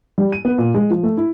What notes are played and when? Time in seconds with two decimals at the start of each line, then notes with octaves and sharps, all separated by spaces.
0.18 G3
0.32 D#7
0.45 B3
0.58 A#2
0.74 G#3
0.90 F3
1.03 A3
1.17 E4